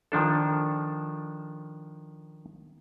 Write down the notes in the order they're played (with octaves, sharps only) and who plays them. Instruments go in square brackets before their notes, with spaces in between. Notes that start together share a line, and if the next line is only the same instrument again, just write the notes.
[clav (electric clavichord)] D#3 F3 D4 A4